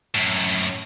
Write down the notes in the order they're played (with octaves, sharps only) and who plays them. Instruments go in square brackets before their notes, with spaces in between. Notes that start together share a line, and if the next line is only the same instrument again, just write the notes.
[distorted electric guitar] F#2 A2